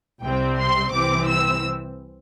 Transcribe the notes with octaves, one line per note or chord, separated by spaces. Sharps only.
C2 C3 G3 C4 G5
C6
C2 C3 E3 C4 D6
E6